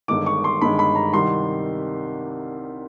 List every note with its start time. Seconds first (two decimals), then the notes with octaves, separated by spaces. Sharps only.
0.08 G1 G2 D#3 G#3 D6
0.26 C#6
0.44 C6
0.61 G1 G2 D#3 G#3 B5
0.79 B5
0.95 A#5
1.13 C2 C3 D#3 G3 C6